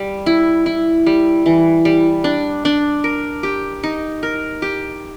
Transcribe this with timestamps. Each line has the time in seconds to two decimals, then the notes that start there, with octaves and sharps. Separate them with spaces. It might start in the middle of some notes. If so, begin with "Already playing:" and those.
Already playing: G3
0.26 E4
0.66 E4
1.06 G3
1.46 E3
1.85 G3
2.24 D4
2.65 D4
3.04 A#4
3.43 G4
3.83 D#4
4.23 A#4
4.62 G4